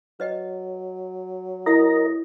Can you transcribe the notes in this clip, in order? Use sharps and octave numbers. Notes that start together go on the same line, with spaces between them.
F#3 B4 D#5 G5
E4 A#4 D#5 E5 F#5 A#5